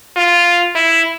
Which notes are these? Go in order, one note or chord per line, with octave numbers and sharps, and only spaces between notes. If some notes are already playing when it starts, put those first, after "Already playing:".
F4
E4